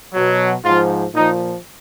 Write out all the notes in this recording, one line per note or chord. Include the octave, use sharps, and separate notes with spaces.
B2 F#3
G#2 F3 F4
A#2 F3 D#4